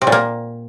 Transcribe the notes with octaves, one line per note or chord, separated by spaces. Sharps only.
C3
A#2
A#3